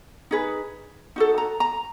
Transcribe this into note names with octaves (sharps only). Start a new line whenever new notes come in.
D#4 G#4 B4
D#4 F#4 A4
A#5
A#5